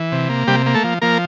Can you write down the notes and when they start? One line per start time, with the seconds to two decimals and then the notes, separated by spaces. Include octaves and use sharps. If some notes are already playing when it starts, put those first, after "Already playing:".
Already playing: E3
0.12 C3
0.30 A#3
0.47 C3 G3 G4
0.66 A#3
0.74 A3 A4
0.84 F3
1.02 F3 A#3 A#4